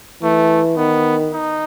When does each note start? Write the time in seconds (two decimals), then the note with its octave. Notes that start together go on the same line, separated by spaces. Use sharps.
0.22 E3 A3
0.77 D#3 B3
1.33 D#4